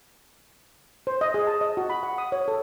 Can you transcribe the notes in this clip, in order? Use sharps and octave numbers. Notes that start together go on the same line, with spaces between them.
C5
D#5
G#4
A5
D#5
F#4
B5
F#5
D#6
C#5
A4